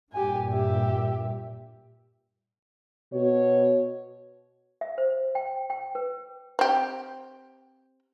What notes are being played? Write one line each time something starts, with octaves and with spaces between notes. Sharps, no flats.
G2 A#2 G4 G#5
G4 E5
B2 C#5
E5
C5
G5
G5
B4
C4 G4